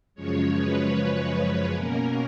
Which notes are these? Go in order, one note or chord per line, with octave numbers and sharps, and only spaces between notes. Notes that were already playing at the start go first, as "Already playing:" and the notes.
F#2 C#3 F3 G#3 C#5
B4
C#5
B2 A#3 C#4 A#4